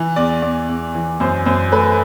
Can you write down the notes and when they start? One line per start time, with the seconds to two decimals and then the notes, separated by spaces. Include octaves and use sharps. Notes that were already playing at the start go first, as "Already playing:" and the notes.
Already playing: E3
0.16 E2 D5
0.42 E2 D5
0.69 E2
0.95 E3
1.20 F#2 C5
1.46 F#2 C5
1.72 A3 B4